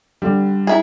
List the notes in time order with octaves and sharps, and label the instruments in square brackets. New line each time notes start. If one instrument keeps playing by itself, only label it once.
[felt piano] D3 G3
[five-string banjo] E4 G#4